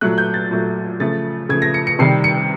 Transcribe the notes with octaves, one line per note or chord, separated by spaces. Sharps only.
A#2 F#3 A3 F#6
G6
A6
A#2 F#3 A3
C#3 F3 A3 A6
C#3 F3 A3 G#6
A#6
C#7
C#7
C3 D#3 G3 C7
C#7